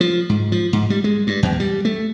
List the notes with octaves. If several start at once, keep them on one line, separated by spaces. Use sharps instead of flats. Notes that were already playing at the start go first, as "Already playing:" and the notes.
F3
G#2
F3
G#2
G3
G#3
G2
E2
G3
A3